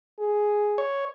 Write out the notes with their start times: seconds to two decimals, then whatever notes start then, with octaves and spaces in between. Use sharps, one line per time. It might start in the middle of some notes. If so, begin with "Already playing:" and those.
0.19 G#4
0.78 C#5